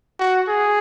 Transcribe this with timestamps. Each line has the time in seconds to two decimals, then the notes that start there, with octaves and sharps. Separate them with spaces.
0.20 F#4
0.49 G#4